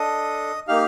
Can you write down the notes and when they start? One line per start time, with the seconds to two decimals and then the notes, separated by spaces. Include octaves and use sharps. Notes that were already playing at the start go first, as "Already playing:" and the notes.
Already playing: D4 A4 D#5 D#6
0.68 A#3 D#4 G4 F5 F6